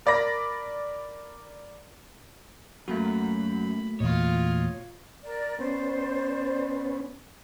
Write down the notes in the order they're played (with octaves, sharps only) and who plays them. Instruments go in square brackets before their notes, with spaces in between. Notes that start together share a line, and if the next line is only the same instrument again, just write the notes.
[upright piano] A#4 D5 B5 A#6
[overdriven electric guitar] F#2 [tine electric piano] A3 A#3 F#4 [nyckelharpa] B5
[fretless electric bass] E2 A#2 [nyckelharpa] F4 D#5 [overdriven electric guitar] C#5
[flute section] A#4 D5
[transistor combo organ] B3 C#4 [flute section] C5 D5